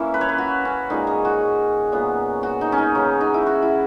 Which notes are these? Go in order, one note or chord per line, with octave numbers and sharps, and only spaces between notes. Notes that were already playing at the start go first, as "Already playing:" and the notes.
Already playing: E3 A#3 C#4 E4
B4
C#5
B4
F#4
C#4
A#2 G#3 C#4 D#4
G#4
F#4
A#2 F#3 B3
F#4
D#4
C#4
D#4
C#3 F#3 B3 C#4
D#4
E4
F#4
E4